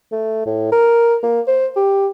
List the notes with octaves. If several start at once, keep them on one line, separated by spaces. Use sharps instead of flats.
A3
A2
A#4
A#3
C5
G4